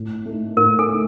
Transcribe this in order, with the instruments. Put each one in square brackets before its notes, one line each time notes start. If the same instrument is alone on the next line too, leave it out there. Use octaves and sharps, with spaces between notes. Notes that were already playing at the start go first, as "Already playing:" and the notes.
Already playing: [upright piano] A2
A3 D#4
[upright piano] A2 [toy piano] A#4
[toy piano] A4
[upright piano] A3 D#4